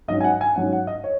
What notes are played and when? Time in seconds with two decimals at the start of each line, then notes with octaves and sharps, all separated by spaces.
0.08 G#2 F#3 C#4 D#5
0.21 G#5
0.24 F#5
0.41 G#5
0.56 G#2 F#3 C#4 F#5
0.73 F#5
0.87 D#5
1.04 C#5